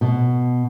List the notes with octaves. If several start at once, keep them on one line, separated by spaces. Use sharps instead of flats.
B2